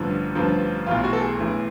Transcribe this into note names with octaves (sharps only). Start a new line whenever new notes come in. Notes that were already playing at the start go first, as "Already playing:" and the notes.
Already playing: A1 G2 D3 F3
A1 G2 D3 F3
B1 A2 E3 F4
F#4
A4
G#4
B1 A2 E3